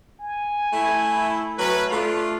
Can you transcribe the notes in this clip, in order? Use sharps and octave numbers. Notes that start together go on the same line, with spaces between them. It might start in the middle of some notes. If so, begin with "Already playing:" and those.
G#5
A3 E4
F#3 A3 C#4 B4
A3 D4 F4